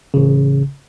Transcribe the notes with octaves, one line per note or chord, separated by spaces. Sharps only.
A1 C#3